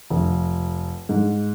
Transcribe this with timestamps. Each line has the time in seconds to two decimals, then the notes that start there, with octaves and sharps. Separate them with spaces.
0.10 F1
1.09 G#2